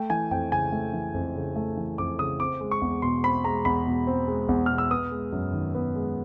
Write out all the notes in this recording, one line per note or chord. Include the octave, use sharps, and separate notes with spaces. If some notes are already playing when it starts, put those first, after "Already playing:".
Already playing: A3 G5
E3 G#5
F2 G5
C#3 G#5
A3
E3
F2
C#3
A3
E3
F2 D6
C#3 D#6
C4 D6
G#3
C#6
E2
B2 C6
C4 B5
G#3 A#5
E2 B5
B2
C4
G#3
E2
B2 F6
E6
B3 D#6
G#3
F#2
D#3
B3
G#3